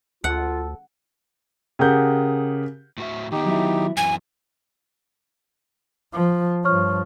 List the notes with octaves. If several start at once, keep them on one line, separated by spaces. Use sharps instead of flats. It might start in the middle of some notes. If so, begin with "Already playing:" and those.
D2 F4 A4 F#5
C#3 G4 G#4 A#4 F#5 G6
A2 F#4 E5
D#3 B3 D#4 G4
F#3 E4
F#2 E3 G#5
F3
G2 F3 C#5 C#6 F6